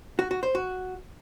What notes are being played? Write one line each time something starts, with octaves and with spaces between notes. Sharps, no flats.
F#4
F#4
C5
F#4